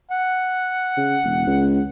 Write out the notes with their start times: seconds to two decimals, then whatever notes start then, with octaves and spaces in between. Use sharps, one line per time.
0.11 F#5
0.97 C#3
1.24 E1
1.47 C#2